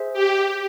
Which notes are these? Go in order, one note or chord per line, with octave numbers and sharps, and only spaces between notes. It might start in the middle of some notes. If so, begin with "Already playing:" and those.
Already playing: G#4 C5 E5
G4